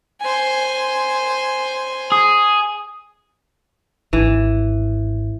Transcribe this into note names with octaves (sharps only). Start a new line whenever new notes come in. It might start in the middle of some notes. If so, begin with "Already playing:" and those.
C5 G#5
G#4
G#1 E3